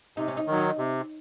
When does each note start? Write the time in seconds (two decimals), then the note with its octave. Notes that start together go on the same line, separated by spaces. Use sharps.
0.17 C3 D#4
0.28 C#4
0.37 D#4
0.47 D#3 F#3
0.57 D#4
0.77 C3